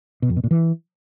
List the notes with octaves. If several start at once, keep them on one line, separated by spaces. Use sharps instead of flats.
B2
F2
B2
A#2
E3